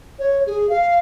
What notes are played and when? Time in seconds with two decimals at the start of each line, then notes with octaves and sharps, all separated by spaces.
0.19 C#5
0.46 G#4
0.69 F5